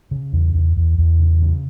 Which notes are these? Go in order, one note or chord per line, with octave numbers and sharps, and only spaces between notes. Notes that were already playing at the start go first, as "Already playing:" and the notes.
C#3
E2
E2
E2
E2
C#3
C#3